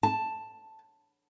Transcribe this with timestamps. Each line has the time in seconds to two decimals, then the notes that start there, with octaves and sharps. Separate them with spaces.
0.03 A5